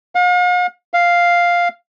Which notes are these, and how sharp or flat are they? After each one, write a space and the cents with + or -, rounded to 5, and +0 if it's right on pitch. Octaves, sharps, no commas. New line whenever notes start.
F5 +45
F5 +0